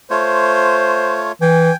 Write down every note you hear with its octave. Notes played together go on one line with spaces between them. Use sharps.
A3 F4 C5 C#5
E3 G5 G#5